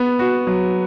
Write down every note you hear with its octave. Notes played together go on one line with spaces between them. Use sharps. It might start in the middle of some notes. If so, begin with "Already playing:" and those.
Already playing: B3
F#4
F#3